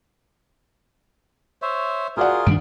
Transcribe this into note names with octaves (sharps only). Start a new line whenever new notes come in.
C5 C#5 E5
F4 F#4 G#4 A#4 D5 F#5
G2 D#3 D4 D7